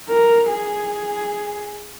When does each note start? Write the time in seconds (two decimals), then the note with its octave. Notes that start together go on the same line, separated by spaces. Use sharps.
0.10 A#4
0.51 G#4